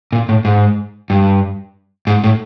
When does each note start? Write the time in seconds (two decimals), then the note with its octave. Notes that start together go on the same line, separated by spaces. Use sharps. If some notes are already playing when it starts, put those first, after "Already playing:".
0.12 A#2
0.29 A2
0.45 G#2
1.10 G2
2.07 G#2
2.24 A2